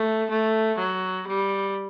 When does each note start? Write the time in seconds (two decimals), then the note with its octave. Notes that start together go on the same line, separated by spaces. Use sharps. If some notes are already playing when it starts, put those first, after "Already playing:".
Already playing: A3
0.30 A3
0.79 F#3
1.28 G3